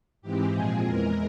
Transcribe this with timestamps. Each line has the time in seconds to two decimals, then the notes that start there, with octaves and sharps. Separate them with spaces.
0.22 G#2 E3 G#3 C4 G4
0.52 A#2 F3 G#3 C4 G#4
0.84 E2 E3 G#3 A#4